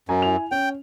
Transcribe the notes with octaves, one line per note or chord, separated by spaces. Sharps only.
F#2 G#5 A#5
E4 G#5 F7
C#4 G5